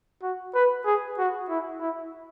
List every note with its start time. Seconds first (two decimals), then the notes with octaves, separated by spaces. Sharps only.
0.22 F#4
0.55 B4
0.86 G#4
1.18 F#4
1.49 E4
1.81 E4